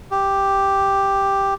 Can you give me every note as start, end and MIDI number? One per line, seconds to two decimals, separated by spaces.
0.11 1.54 67